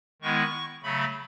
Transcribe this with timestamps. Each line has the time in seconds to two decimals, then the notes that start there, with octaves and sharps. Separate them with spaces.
0.22 D#3 G#3 B3 E4 C#6
0.83 C#3 F#3 A3 B5